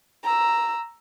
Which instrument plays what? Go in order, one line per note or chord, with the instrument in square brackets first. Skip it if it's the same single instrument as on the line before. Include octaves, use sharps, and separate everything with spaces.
[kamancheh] A#5 E6